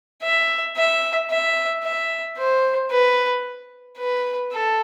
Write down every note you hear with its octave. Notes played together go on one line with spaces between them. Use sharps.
E5
E5
E5
E5
C5
B4
B4
A4